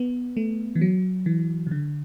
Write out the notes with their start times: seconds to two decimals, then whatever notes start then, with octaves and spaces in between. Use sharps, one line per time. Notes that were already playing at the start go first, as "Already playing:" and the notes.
Already playing: B3
0.37 A3
0.76 E3
0.81 F#3
1.26 E3
1.67 C#3
1.71 D3